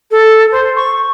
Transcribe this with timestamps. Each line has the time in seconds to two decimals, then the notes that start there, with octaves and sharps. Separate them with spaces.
0.11 A4
0.51 C5
0.76 C#6